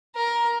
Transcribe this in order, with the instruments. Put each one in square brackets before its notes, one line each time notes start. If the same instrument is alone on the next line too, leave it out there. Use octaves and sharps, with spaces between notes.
[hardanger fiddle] A#4